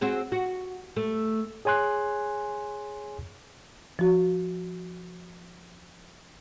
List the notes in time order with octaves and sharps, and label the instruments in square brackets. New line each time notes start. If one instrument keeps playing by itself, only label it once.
[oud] C4 F#4 G#4
F#4
A3
[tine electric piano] G#4 C#5 G#5 C6 F#6
[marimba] F3 F#4